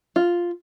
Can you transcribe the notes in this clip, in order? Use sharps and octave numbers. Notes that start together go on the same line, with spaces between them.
F4